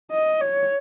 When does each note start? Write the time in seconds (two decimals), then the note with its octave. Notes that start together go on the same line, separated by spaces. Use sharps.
0.11 D#5
0.40 C#5